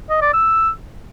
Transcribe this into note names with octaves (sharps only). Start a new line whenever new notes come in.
D#5
D5
E6